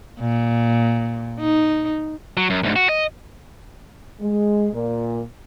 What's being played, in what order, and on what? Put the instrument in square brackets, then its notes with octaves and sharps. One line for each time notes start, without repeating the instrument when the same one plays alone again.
[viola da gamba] A#2
D#4
[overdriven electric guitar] F#3
F#2
D2 G#2
F#4
D#5
[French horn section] G#3
A#2